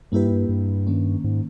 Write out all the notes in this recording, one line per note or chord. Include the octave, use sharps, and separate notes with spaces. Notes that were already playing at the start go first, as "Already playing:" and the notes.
G2 G3 A#3 E4 G4 B4
G#2
G2
G2
D#3 A#3 C#4
G#2